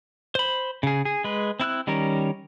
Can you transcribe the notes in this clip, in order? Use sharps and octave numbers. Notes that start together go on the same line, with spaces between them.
C5 B5
C#3 G#4
G#4
G#3 B4
C4 E4 E6 F#6
D#3 G3 C#4 A#4